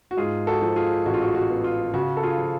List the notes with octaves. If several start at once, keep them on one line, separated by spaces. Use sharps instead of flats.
F#4
G#2 F4 G#4
F#4 A4
F3
F4 G#4
A1 F#4
F4
F#4
F#4
B3
F4
C#3 F#4
A4
F4 G#4
F3